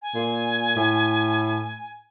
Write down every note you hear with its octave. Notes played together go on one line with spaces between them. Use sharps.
G#5
A#2
A2